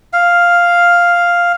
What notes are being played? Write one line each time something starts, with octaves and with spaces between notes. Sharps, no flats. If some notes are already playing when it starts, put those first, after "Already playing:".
F5